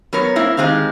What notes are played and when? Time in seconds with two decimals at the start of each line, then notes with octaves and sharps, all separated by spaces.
0.13 F#3 B3 A#4 C#5
0.36 A#3 C4 E4
0.57 D#3 G#3 C4 G4 F5